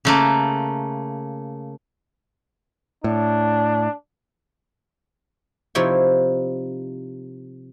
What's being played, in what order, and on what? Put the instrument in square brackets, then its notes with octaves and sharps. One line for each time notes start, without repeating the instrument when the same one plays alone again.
[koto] C#3 A3 A#3
[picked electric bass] A2 [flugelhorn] D4
[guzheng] C3 F3 D#4 E4 C#5 G5